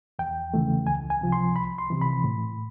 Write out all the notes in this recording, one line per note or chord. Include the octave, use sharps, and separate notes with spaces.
E2 G5
C#3 E3 A3
C#2 G#5
G#5
C3 F3
C6
C2 B5
C6
C3 E3
B5
A2